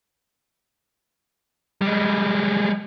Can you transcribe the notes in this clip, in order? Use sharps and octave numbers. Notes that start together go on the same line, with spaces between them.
G3 G#3